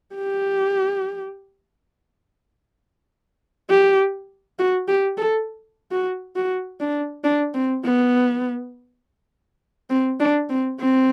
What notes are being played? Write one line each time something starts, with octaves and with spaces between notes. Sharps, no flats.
G4
G4
F#4
G4
A4
F#4
F#4
D4
D4
C4
B3
C4
D4
C4
C4